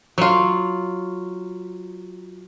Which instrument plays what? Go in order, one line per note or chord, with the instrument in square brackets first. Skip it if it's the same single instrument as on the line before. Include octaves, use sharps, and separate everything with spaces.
[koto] F#3 F4